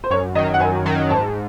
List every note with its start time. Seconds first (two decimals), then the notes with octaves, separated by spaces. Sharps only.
0.04 C5
0.10 F#2 C#5
0.35 D#3 D#5
0.38 F#3
0.54 F#5
0.60 F#2 G#5
0.86 D#3 F#3
1.10 G#2 A5